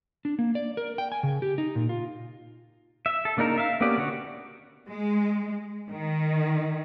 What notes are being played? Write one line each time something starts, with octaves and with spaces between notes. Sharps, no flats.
D4
A#3
D5
A#4
G5
G#5
C#3
G4
D#4
A#2
F4
E5
A4
C#3 A#3 D4 D#4 A#4
E5 F5
A#3 B3 C#4 G4 D5
D3 B3 F#4 C#5
G#3
D#3